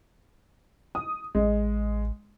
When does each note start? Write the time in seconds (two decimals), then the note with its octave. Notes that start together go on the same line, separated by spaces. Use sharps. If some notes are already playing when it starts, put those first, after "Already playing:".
0.95 D#6
1.35 A1 G#3